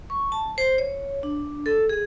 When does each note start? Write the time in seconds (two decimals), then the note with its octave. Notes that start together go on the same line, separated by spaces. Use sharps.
0.10 C#6
0.32 A5
0.58 C5
0.78 C#5
1.23 D4
1.66 A4
1.89 G#4